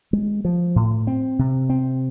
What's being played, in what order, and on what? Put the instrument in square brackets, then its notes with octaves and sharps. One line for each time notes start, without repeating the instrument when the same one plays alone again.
[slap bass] G#3
F3
A2
C4
C3
C4